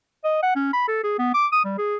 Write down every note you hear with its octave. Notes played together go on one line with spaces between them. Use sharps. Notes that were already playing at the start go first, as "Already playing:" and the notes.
D#5
F#5
C#4
B5
A4
G#4
B3
D6
D#6
G3
G#4